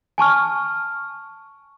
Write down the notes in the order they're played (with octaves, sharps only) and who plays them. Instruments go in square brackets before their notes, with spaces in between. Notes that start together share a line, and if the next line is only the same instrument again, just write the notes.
[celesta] G#5 A5 C#6 F6